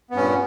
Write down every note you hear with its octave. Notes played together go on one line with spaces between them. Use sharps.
G2 A#2 B3 C#4